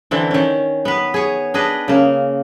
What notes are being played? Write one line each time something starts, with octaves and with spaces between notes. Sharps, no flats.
D3 E3 C4
D#3 C#4
B3 B4
G#4 C#5
D4 G#4 B4 D#5
C#3 A#3